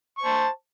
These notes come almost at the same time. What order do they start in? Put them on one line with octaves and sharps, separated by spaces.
C#6 C5 A5